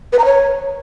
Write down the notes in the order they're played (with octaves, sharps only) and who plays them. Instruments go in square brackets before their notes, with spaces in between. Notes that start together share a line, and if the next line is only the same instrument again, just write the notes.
[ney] B4
A#5
C#5